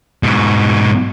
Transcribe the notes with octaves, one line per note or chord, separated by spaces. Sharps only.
G#2 B2